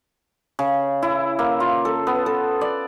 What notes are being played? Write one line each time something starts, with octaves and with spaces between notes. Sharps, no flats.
C#3
E4
A#3
F4
A4
B3
A4
D5